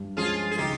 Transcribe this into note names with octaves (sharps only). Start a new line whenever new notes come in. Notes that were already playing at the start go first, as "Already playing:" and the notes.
Already playing: G2
F3 G#3 C#4 F4 G#4
G#4
C#3 D#4 G4